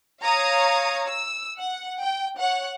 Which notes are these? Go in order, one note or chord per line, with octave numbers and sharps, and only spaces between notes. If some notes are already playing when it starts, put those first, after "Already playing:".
C#5 F5 A#5 C#6 D#6 G#6
E6
F#5
G5
C#5 F#5